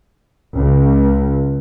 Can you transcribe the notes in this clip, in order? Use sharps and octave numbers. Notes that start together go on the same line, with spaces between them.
C#2